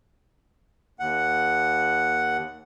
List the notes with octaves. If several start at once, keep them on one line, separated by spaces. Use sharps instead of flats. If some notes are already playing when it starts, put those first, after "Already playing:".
D#2 F#5